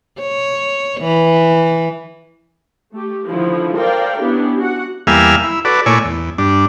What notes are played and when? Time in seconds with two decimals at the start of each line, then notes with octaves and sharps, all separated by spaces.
0.20 C#5
1.01 E3
2.93 A3 G4
3.27 D3 D#3 F3 E4
3.77 A4 A#4 C5 D5 F5 G5
4.19 B3 C#4 D4 E4 G4
4.58 F#4 F#5
5.07 E2 G3 A#3 E5 F5 G#5
5.44 E4
5.65 F#4 A4 B4 D5
5.86 A#2 A3 E4 C#5 D5 G#5
6.05 E2
6.38 G2 D4